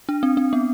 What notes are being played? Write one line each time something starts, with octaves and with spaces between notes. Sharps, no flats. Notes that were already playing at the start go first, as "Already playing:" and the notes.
D4
C4
C4
B3